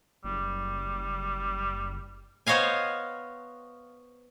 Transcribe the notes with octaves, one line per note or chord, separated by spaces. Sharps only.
F#1 G3
B3 C5 C#5 D#5 F5 G#5